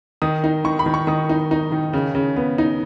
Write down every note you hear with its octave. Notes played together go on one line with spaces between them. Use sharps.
D#3 D#6
D#4
D#3 C#6
B5
D#3
C#6
D#3 D#6
D#4
D#4
D#3
C#3
C#3
B3
D#4